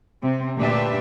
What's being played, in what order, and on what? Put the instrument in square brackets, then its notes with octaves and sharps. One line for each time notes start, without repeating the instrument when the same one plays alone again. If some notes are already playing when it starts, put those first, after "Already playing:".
[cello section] C3 C4
D2 A#2 D4 G4 B4 E5